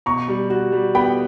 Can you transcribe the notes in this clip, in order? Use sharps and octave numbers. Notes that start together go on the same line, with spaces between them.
B2 A#5 C#6
G3
F#4
G3
B3 G5 B5